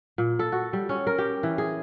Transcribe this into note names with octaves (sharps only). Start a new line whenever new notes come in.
A#2
A4
F#4
G3
C#4
A#4
G4
E3
G#4